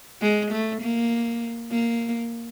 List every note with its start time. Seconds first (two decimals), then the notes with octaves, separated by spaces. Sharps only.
0.22 G#3
0.51 A3
0.81 A#3
1.71 A#3